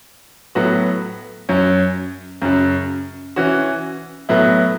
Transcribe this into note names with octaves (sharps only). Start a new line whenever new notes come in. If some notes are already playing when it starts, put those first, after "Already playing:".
A2 F#3 B3 F#4
F#2 F#3 C#4
F#2 C#3 F#3
E3 C#4 F#4
A2 F#3 B3 E4